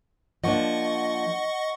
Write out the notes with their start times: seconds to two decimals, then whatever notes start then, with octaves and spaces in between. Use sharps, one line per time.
0.44 F3 A#3 D4 D#5 F#5 C#6